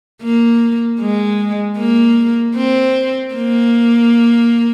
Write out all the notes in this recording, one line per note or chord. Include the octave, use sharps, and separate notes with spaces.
A#3
G#3
A#3
C4
A#3